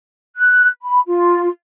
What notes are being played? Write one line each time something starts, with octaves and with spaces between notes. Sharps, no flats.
F#6
B5
F4